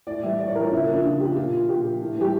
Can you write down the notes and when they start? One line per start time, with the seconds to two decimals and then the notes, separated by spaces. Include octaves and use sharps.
0.07 A2 D5
0.23 E3 G3 E5
0.39 A2 D5
0.48 C#5
0.55 E3 A#4
0.59 G3
0.64 F4
0.71 C#3 E4
0.83 A#3
0.88 F3
0.93 D4
1.04 C#3 F4
1.20 F3 G4
1.36 A#2 F4
1.53 F3
1.69 A#2 G4
1.84 F3
2.02 A2
2.17 E3 G3 G4